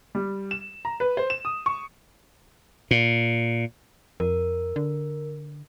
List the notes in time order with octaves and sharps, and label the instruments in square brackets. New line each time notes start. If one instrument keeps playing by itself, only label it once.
[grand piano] G3
E7
A#5
B4
C5
E7
D#6
C#6
[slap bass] A#2
[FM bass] F2 [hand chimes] A#4
[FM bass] D3